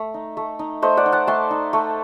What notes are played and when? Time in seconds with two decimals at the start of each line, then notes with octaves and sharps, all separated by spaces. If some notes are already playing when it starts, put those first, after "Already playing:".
Already playing: A3
0.14 D#4
0.37 A3
0.59 D#4
0.82 A3 C5 D#5
0.97 D5 F#5
1.06 D#4
1.12 F#5 A5
1.27 A3 A5 C6
1.51 D#4
1.73 A3